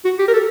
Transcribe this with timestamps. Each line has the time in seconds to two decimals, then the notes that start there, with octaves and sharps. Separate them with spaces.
0.05 F#4
0.19 G4
0.28 A#4
0.33 A4